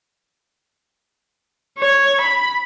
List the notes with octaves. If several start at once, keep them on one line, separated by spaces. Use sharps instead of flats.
C#5
B5